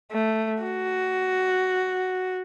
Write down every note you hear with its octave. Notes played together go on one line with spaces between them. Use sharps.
A3
F#4